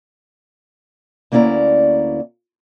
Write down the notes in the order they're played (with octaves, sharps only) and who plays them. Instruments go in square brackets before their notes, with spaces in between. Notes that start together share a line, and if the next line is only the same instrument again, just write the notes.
[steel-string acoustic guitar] D2 A#3 C#4 E4 D5 A#5